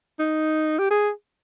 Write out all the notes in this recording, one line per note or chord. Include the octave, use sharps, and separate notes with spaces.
D#4
G4
G#4